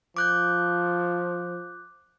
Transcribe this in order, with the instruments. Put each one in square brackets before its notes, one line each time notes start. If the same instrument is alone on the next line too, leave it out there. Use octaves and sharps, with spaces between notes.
[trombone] F3 [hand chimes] D6 F#6 G6